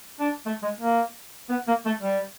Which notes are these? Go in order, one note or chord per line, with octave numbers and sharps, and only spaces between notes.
D4
A3
G#3
A#3
B3
A#3
A3
G3